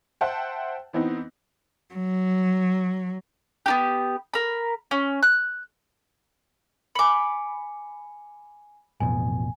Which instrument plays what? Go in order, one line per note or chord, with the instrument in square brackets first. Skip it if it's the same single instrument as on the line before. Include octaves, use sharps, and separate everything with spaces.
[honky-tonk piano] C5 E5 F#5 G5 A5
E3 B3 C4 D#4
[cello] F#3
[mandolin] B3 D#4 G4
A#4 B5
C#4
F#6
[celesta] G#5 C#7 [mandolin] B5 D6
[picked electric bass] A1 F2 B2 [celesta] G#5